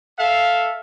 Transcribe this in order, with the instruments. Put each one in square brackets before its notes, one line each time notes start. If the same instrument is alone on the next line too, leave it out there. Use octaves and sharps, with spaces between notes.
[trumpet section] A4 E5 F5